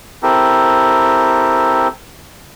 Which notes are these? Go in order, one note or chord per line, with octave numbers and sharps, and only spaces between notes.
C4 E4 G4 A4 A#4